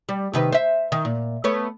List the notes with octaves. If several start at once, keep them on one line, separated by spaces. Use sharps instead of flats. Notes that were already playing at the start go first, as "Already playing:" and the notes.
G3
C3 D#3 B4
C5 E5
D#3
A#2
A3 B3 C#5